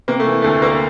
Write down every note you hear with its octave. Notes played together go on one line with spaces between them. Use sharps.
C3 A#3
A3
E3
D2 A3
D2 A#3